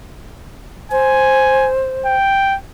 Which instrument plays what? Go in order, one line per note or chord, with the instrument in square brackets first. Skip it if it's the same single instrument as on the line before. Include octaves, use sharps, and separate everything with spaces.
[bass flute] C5 [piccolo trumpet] G#5
[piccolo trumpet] G5